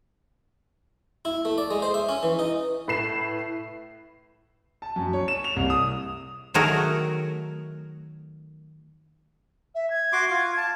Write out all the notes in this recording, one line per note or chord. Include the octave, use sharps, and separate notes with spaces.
E4
A3
D5
G#3
C5
E5
C#4
E3
D#4
A2 B4 C7 E7
A5
F#2
C#5
E7
F7
C2
D#6
D#3 F#3 A3 F#4 G#4 A#4
E5
G#6
F#4 C6 D6
F4
A5